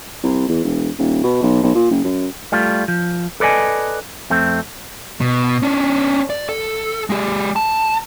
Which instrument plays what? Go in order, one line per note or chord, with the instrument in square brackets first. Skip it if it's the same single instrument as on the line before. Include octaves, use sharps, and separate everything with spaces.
[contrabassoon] C2
E2
E1
D#1
B2
B1
B1
A#2
F#1
F#2
[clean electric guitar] G3 A3 F4
F3
A4 B4 D5 D#5 G#5
F2 A3 C4
[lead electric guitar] B2
C#4 D4
D5
A4
G#3 G4
A5